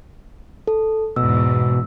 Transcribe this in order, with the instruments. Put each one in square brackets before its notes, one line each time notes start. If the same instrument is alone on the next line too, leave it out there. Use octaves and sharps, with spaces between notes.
[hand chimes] A4
[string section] E2 G#2 [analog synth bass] B2 [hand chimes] E6